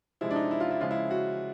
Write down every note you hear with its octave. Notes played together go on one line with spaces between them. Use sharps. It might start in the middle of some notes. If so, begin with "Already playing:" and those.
C3 F3 G#3 E4
D4
D#4
E4
F4
E4
C#3 F3 G#3 F4
E4
F#4